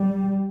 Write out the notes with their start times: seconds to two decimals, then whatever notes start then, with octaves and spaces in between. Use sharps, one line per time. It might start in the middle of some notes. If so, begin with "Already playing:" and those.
Already playing: G3